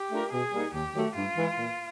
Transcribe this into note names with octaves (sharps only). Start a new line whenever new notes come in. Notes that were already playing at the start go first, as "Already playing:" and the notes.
Already playing: G4
A3 D4 F4 A#4
B2 G#4
G3 A#3 D#4
D#2 G4
D#3 F#3 A3
G2 F4
E3 G#3
A#2